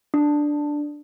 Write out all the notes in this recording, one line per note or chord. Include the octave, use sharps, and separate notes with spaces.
D4